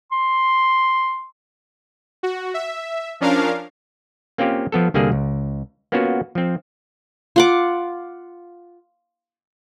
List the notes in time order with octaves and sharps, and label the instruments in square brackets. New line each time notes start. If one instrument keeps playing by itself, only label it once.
[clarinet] C6
[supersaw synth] F#4
E5
F3 C#4 D4 A#4 F5
[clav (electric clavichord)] A#3 C4 C#4 F4 G4
F3 B3 A4
C2 D3 G3 A#3 G#4
C#2
A#3 B3 C#4 F4 F#4
F3 C4
[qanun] F4 F#5 D6